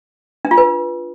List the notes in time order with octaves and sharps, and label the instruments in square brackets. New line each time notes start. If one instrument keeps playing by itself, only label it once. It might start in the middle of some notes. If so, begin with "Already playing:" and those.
[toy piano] D4
F4
B4